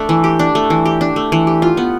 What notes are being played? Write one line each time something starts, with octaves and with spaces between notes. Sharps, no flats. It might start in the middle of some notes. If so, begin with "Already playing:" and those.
Already playing: A3 D4
E3
G4
D4
A3
E3
G4
D4
A3
E3
G4
F4
B3